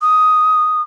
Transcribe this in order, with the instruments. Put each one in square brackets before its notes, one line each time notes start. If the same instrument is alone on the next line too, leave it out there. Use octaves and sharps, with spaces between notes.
[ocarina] D#6